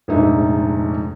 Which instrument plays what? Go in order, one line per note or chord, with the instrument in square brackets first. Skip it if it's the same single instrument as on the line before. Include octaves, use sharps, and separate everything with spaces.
[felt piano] F1 A#1 G#2 D#4 E5